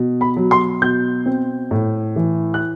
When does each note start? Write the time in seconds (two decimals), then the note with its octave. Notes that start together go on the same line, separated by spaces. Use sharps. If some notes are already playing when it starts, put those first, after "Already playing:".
Already playing: B2
0.21 B5
0.37 F#3
0.51 C6
0.82 B2 G6
1.26 C4
1.71 A2
2.16 E3
2.54 F#6